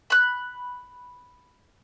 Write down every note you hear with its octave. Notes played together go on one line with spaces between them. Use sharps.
B5 F#6